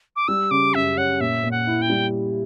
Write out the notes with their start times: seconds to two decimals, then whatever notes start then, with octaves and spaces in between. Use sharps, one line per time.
0.16 D6
0.28 G3 E6
0.51 C#3 D6
0.74 F#2 E5
0.97 C#4 F#5
1.20 A#2 E5
1.44 A#2
1.51 F#5
1.67 E4
1.82 G5
1.90 G3